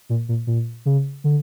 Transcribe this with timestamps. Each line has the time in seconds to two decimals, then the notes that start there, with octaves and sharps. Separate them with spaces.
0.09 A#2
0.29 A#2
0.47 A#2
0.86 C#3
1.24 D3